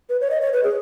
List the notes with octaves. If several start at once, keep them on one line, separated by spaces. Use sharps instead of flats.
B4
C#5
D#5
C#5
B4
G#4